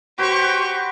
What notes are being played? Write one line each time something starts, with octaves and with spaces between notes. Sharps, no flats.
F#4 G4 B4 C5 C#6